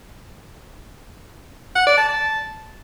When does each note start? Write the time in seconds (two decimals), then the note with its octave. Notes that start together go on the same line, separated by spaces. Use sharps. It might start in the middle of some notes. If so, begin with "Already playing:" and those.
1.76 F#5
1.87 D5
1.98 A5
2.09 A5